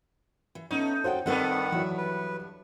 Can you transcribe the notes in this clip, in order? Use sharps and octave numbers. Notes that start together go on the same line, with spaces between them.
E3
A3 B3 C#4 D#4 C#5
F#4 A4 C5 C#5 F#5 G5
G2 D#3 G3 B3 C4 A4 B4 F#5
E3 F#3 E5
B4